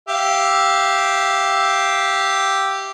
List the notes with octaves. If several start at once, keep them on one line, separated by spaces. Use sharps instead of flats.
G4 E5 F5